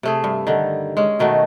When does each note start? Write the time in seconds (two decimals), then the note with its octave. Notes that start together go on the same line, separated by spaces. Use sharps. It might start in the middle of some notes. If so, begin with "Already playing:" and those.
0.03 C3 A3 G#4
0.24 G2
0.47 D3 D#3
0.97 G#3 C#4
1.19 B2 D#3 A3 F#4